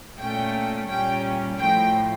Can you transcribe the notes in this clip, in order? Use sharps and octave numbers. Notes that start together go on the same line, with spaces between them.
A#2 A3 C#4 G5
A#2 G3 C#4 G5
A2 F3 A3 G5